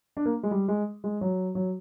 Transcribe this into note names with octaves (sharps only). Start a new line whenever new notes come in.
D4
A#3
G#3
G3
G#3
G#3
F#3
F#3